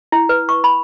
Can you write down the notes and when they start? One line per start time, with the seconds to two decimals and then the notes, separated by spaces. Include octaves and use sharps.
0.12 E4
0.29 B4
0.49 C#6
0.64 B5